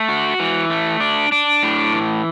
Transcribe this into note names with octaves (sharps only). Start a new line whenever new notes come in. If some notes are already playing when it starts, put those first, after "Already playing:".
Already playing: A3
F#4
E3
A3
D4
D4
A2
E3